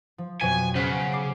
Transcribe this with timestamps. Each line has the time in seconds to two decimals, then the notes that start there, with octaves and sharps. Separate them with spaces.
0.18 F3
0.41 F2 B2 F#3 G#5
0.75 C#3 C5 F#5
1.12 D6 C7 D7